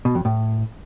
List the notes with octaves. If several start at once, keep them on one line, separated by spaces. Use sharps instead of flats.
B2
F2
A2